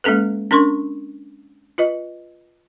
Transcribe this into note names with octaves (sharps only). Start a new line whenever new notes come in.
G#3 A#3 C#4 A4 B4
C#4 D4 A#4 C6 C#6
F4 B4 D#5